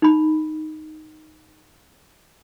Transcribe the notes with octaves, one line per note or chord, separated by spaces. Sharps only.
D#4 B5